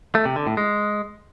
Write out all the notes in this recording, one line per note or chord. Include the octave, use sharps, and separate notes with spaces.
A3
C3
D3
A2
G#3